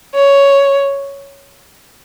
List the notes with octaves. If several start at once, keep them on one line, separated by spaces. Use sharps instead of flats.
C#5